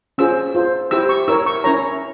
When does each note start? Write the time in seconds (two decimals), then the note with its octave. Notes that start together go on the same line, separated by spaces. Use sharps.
0.18 C#4 F4 G#4 C5 E6
0.55 F4 C5
0.91 E4 G4 C5 E6
1.09 C#6
1.28 E4 A#4 C#5 E6
1.46 C#6
1.64 C#4 E4 A#4 C#5 A#5